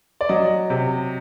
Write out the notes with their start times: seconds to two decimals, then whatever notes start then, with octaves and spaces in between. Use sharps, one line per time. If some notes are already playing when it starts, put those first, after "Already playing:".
0.21 D5
0.29 F#3 D#5
0.70 C3